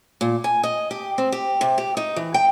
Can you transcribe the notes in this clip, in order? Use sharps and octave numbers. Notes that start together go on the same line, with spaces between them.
A#2
G#5
D#5
G4
C4
G4
C3
G4
D#4
E3
G5